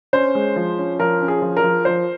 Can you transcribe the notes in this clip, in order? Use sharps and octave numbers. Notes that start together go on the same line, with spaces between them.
C#4 C5
G#3
F3
C#4
F3 A#4
C#4
G#4
F3
A#4
F3
F3 C5